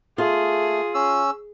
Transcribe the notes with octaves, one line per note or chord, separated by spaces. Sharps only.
A3 F4 G#4
C#4 E6